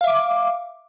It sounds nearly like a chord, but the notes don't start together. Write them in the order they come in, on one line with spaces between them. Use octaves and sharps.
F5 E5 D6